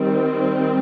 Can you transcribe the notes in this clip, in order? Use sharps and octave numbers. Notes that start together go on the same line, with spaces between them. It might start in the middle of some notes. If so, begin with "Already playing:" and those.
Already playing: D#3 G3 C4